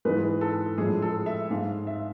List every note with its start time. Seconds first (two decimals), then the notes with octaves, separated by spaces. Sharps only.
0.05 G#2 E3 G#3 B4
0.41 A4
0.78 A2 F3 G#3 G#4
1.02 A4
1.26 E5
1.50 G#2 G#3 F5
1.87 E5